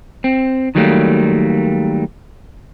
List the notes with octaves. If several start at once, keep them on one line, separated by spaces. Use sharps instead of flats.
C4
D#3 F#3 G3 A3 A#3